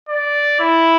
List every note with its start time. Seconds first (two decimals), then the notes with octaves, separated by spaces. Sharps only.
0.09 D5
0.60 E4